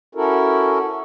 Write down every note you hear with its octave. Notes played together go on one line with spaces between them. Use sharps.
C#4 E4 F#4 A4 A#4